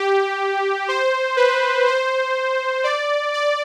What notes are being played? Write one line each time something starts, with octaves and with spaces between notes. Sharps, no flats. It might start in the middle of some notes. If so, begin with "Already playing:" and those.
Already playing: G4
C5
B4
C5
D5
D5